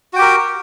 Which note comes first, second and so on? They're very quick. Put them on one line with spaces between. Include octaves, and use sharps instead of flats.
F#4 G5 G4 A#4